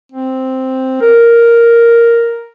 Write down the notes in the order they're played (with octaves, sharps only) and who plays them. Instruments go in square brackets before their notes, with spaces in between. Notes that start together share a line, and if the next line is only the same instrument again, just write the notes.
[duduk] C4
A#4